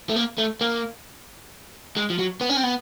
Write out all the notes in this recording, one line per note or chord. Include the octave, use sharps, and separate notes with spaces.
A3
A#3
A3
A#3
G#3
F3
F#3
B3
C#4
C4
B3